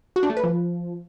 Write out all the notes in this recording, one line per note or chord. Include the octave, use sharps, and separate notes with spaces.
F#4
D4
A3
B4
F3